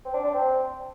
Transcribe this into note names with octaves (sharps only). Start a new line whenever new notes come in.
C4
D4
D4
C4